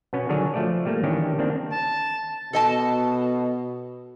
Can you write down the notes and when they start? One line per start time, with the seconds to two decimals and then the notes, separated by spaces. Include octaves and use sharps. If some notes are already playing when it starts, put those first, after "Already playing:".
0.13 B2 B3 C#4
0.29 D3 D#3 F#3 D4 G#4 C#5
0.54 F3 A3 D5
0.86 G3 A3 A#3
1.03 D#3 E3 C#4 D4 G4
1.39 D#3 A#3 C4 D4
1.72 A5
2.53 B2 A4 D#5 A5